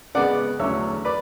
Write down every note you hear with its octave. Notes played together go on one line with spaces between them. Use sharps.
C#3 G#3 B3 D5 F#5
E2 D3 F#3 A3 C#4 C#5 E5
B4 D5